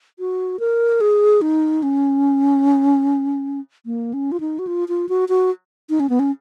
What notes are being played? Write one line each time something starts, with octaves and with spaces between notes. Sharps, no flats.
F#4
A#4
G#4
D#4
C#4
A#3
C#4
F4
D#4
F#4
F4
F4
F#4
F#4
D#4
C#4
B3
C#4